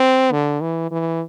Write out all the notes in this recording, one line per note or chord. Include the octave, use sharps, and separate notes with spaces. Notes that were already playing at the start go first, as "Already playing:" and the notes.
Already playing: C4
D3
E3
E3